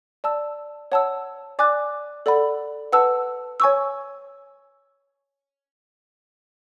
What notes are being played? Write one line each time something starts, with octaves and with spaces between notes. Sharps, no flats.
D5 A5 E6
C#5 F#5 A5 E6
D5 G#5 D6 F#6
A4 D5 F#5 B5
B4 F#5 A5 E6
C#5 G#5 C#6 E6